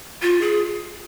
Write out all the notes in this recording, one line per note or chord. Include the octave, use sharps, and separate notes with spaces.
F4
G#4